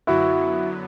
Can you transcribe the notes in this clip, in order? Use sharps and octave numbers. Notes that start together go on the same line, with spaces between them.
F#2 D3 F#3 B3 E4 F#4